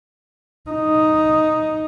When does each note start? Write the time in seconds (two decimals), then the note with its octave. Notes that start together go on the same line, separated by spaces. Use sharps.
0.70 D#4